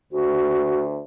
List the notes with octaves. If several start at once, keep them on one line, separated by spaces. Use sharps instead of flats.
D2 F#4